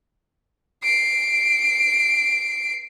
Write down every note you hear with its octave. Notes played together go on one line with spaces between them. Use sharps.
C7 D7